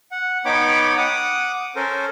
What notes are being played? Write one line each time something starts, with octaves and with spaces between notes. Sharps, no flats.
F#5
B3 D#4 C#5 G5 B5 D6
F#5 D6 D#6
C#4 A4 A#4 C5